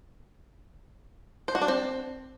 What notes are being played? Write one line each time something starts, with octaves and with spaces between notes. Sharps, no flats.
C5
F#4
D4
C4